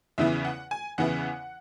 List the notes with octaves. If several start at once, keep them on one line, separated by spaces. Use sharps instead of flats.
E2 C#3 E3 B3 E4 E5
F#5
G#5
E2 C#3 E3 B3 E4 F#5